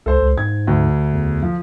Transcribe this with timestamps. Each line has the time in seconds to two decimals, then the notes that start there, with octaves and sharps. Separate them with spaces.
0.06 C#2 A4 C5
0.22 C#2
0.38 G#2 G#6
0.67 D2
1.13 E2
1.42 F3